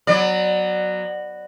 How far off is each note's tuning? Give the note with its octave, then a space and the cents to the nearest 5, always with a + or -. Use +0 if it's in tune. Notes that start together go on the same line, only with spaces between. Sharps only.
F#3 +0 B3 +0 D5 +30